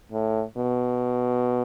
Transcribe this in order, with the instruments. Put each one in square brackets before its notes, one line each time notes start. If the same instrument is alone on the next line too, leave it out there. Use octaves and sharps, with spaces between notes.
[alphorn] A2
B2